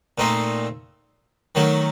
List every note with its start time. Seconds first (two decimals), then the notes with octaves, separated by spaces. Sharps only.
0.18 A#2 A3 C4 D#4
1.55 D#3 F#3 A3